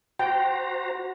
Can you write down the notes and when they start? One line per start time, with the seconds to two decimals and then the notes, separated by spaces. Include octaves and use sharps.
0.19 F#4 C5 G5 A#5